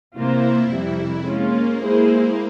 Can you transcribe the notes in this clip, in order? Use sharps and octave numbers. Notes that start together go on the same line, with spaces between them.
C3 E3 A#3 E4 F4 C5
F2 C3 E3 G3
G#3 A#3 C#4 F4
G#3 E4 G#4 C5